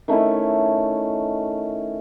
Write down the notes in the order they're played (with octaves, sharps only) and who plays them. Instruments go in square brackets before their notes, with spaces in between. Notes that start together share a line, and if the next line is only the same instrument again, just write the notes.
[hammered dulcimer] D#3 A3 C#4 E4